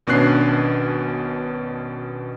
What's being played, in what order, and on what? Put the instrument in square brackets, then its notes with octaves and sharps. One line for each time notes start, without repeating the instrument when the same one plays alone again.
[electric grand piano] G#1 B2 C#4 D4 F#6 C7